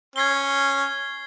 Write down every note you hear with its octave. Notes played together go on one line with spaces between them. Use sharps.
C#4 G#6 C7 G7